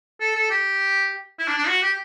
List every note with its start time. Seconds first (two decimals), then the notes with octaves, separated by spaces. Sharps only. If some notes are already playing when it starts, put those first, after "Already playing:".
0.21 A4
0.35 A4
0.50 G4
1.39 E4
1.48 D4
1.58 D4
1.68 F#4
1.82 G4